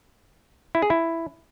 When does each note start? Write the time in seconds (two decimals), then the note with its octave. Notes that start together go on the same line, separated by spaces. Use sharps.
0.75 E4
0.82 G#4
0.90 E4